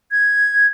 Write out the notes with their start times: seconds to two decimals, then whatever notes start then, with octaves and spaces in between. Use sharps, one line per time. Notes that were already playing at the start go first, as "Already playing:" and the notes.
0.11 G#6